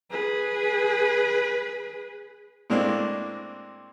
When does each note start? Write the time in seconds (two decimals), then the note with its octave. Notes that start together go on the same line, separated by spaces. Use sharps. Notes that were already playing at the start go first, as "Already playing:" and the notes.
0.11 G#4 B4
2.70 A2 G#3 A#3 C4 D4